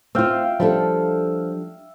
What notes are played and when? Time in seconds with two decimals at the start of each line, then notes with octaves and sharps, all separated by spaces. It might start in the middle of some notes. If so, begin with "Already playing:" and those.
0.15 C4 F4 E5 F5 G5
0.60 F3 G3 D4 A4